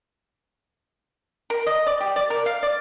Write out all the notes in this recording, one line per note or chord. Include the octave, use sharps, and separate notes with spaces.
A#4
D#5
D5
G4
D5
A#4
F5
D5